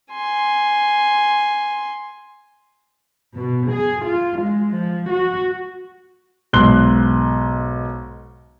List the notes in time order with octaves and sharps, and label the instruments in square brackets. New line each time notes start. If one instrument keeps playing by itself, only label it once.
[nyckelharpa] G#5 C6
[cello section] B2
G#4
F4
G#3
F3
F#4
[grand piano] B1 G#2 A#5 C6 F#6 G7